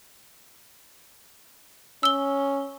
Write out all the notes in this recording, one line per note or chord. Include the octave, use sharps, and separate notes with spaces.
C#4 E6 G7